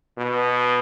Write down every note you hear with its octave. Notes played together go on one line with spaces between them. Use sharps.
B2